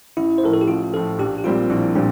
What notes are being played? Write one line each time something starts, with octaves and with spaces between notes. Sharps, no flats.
A1 E4
C5
A2 F3 A#4
A4
G4
A1 F4
A2 F3 A4
A#1 G4
G4
A#2 G3 C4 F4
A#1 E4
A#2 G3 C4 D4